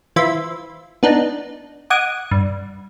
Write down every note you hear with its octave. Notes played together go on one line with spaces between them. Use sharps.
E3 F4 C5 E5 B5
B3 D4 D#4
D#5 F#5 D6 D#6 G#6
G2